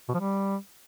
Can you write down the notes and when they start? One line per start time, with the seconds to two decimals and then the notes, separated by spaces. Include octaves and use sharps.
0.09 B2
0.14 F3
0.20 G3